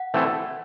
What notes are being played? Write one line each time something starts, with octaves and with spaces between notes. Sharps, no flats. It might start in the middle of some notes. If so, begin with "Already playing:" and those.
Already playing: F#5
E3 A3 C4 E4 A4